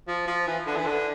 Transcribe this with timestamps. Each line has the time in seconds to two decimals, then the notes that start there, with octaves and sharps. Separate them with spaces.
0.08 F3
0.27 F3
0.47 E3
0.67 D3
0.76 E3
0.86 D3